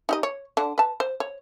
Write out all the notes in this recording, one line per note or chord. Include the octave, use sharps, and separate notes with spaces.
D#4 G4 D#5
C#5
D3 D4
B4 A5
C5
C#5